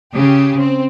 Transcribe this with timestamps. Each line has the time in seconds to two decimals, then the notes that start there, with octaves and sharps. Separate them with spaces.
0.14 C#3 G4
0.58 C4